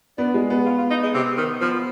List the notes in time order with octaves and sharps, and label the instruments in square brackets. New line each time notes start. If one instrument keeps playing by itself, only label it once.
[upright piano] B3 [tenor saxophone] D4
[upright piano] G#3
B3
[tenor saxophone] F4
F4
D#4
G#3
C3
D#3
[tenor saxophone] F3 [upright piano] B3